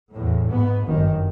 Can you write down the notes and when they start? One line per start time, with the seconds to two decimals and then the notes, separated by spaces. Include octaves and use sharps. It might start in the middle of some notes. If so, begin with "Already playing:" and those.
0.13 E2 A2
0.47 G#2 B3
0.85 G1 F#2 D#3